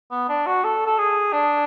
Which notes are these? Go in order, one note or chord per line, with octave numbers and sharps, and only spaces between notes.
B3
D4
F#4
A4
A4
G#4
D4